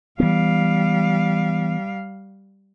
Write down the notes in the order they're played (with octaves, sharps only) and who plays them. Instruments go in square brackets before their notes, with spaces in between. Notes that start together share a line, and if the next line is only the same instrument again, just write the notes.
[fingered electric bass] E3 B3 [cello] G3 F5